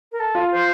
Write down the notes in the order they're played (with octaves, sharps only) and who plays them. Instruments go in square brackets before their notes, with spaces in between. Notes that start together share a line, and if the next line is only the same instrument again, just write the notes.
[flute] A#4
A4
[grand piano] F4
[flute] C5